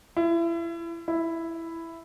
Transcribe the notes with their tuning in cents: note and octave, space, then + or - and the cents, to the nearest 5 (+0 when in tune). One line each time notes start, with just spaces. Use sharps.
E4 +30
E4 +5